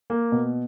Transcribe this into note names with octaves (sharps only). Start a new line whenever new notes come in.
A#3
B2